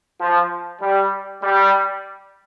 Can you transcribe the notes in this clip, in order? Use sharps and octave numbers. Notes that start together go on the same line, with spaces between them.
F3
G3
G3